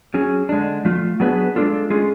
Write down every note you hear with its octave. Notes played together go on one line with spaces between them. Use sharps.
F#3 C#4 G#4
D3 G#3 D4
F3 A3 F4
F#3 B3 D4 G#4 B4
G#3 D4 F4 A4
G#3 C#4 F4 G#4